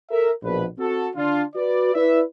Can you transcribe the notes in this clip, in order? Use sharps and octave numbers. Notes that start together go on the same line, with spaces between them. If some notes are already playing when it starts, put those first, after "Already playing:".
A4 A#4 E5
A#1 B2 B4
C4 F#4 A4
D3 D4 F4
F#4 B4 D5
E4 B4 D5 E5